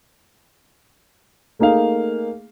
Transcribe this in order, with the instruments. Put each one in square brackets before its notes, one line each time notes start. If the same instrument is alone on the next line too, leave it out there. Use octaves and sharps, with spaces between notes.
[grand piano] A3 A#3 D#4 G#4 F5